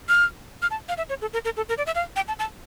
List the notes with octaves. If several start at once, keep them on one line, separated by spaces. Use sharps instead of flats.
F6
F6
A5
F5
E5
C#5
A4
A#4
A#4
A4
A#4
D5
E5
F5
G5
A5
A5